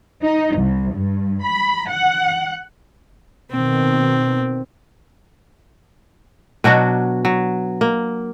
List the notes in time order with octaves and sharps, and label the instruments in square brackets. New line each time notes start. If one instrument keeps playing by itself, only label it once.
[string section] D#4
C2
G2
B5
F#5
[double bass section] B2 D#3 [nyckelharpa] C4
[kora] B2 F#3 D4 F#4
F#3
A#3